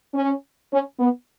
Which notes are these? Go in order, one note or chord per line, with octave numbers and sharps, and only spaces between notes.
C#4
C#4
B3